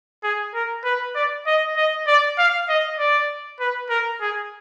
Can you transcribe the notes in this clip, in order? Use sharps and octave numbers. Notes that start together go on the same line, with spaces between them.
G#4
A#4
B4
D5
D#5
D#5
D5
F5
D#5
D5
B4
A#4
G#4